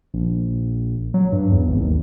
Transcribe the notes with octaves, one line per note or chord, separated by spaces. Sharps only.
A#1
F#3
G2
E2
G#1
D#2